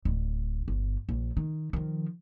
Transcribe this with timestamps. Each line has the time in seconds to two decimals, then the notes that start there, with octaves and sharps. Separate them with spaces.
0.05 D1
0.68 G1
1.09 A#1
1.37 D#3
1.73 D#3 F3